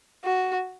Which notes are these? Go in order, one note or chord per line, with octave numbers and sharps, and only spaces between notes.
F#4